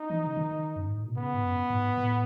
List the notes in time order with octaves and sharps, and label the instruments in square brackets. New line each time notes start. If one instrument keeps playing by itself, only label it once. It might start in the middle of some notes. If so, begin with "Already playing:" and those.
Already playing: [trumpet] D#4
[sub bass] E3
C#3
D#3
F#2
G#2
A2
B2
[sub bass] C#3 [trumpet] B3
[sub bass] G#2
F#2
G#2
A2